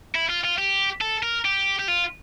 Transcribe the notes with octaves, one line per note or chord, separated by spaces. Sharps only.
E4
F4
F4
G4
A4
A#4
G4
G4
F4